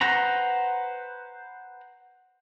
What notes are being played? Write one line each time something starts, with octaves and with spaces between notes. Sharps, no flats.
B4 C5 F#5 A#5 B5